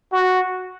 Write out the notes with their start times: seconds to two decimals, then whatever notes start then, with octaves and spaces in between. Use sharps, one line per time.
0.12 F#4